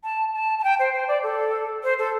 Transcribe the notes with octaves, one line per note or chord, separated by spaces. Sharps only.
A5
A5
A5
G5
C5
C5
D5
A4
C5
A4